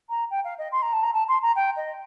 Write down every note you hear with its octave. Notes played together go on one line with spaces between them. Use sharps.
A#5
G5
F5
D#5
C6
A#5
A5
A#5
A5
C6
A#5
G5
D#5